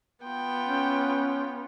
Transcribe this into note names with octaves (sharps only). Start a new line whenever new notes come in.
B3 F4 G5
C#4